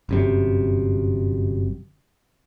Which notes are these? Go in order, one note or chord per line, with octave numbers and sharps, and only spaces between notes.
G1 F#2 C3